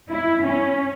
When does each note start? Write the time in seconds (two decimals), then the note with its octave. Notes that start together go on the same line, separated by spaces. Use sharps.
0.12 E4
0.44 C#4